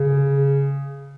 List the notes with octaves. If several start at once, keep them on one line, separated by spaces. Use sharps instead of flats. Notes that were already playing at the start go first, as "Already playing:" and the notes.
Already playing: C#3